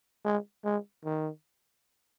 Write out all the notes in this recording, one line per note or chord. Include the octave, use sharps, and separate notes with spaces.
G#3
G#3
D#3